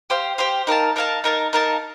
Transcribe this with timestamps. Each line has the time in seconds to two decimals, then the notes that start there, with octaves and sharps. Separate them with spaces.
0.10 G4 C5 F5
0.38 G4 C5 F5
0.67 D#4 A#4 F5 A5
0.96 D#4 A#4 F5 A5
1.24 D#4 A#4 F5 A5
1.53 D#4 A#4 F5 A5